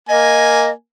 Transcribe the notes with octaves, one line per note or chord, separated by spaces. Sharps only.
A#3 D#5 G#5